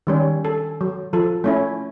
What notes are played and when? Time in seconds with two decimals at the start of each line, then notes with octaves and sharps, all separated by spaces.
0.07 D#3 G3 C#4
0.45 A4
0.81 F#3
1.13 F3 A4
1.44 A3 C#4 E4